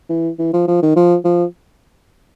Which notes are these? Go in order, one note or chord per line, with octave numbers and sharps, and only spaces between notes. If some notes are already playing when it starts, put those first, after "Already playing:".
E3
E3
F3
F3
D#3
F3
F3